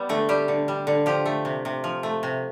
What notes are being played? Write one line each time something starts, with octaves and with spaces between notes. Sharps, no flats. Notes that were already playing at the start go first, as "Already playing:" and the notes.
Already playing: G3 B3
D3 A3
G3 G4
D3
G3
D3
F3 G4
A3
C3
C3
F3
A3
C3